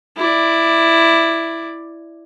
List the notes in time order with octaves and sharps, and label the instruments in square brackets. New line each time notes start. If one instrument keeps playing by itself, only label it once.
[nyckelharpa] E4 D5